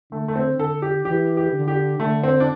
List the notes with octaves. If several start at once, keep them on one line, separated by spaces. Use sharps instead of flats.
D3 A3
A3
C4
D3 A4
G4
E3 G4
G4
D3
G4
D3 A3
C4
D4